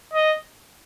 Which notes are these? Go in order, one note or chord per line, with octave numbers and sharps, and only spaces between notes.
D#5